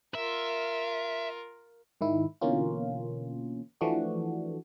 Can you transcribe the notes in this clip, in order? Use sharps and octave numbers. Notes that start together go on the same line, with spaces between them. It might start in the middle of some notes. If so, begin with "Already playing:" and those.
F4 A#4 E5
G#2 D#3 E4
B2 D3 E3 A#3 C#4 F4
E3 F3 A3 D4 F#4